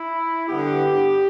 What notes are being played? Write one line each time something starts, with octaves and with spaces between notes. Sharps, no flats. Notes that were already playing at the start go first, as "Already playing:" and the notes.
Already playing: E4
G2 D3 B3 G4